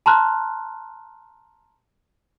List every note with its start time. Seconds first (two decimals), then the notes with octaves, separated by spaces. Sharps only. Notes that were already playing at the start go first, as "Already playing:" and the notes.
0.06 A5 A#5 C6 F6 F#6